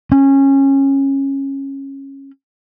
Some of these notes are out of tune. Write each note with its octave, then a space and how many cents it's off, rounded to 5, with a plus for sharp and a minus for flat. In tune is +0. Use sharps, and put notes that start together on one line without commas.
C#4 -20